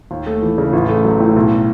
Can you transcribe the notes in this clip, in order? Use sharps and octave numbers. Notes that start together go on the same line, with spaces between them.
D#2
A3
E3
C#3
A1
A3
F#3
A2
B1